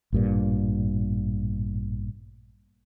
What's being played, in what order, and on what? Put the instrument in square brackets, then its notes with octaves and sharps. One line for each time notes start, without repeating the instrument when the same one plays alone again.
[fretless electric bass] A1 G2 A#2